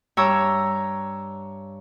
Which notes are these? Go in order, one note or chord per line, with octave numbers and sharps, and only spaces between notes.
G2 C#5 G5 A#5 E6